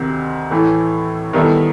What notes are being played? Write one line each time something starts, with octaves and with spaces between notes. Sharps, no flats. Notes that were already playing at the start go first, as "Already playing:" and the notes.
Already playing: D2 C3 D#3
A2 E3 A3
D#3 G3 B3 E4 A4